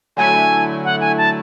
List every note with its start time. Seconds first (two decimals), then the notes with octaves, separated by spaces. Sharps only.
0.17 D3 F#3 A3 E4 G#5
0.84 F#5
1.01 G#5
1.18 A5